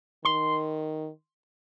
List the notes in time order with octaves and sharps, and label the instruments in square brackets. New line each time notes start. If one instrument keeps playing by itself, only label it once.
[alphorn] D#3 [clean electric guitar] C6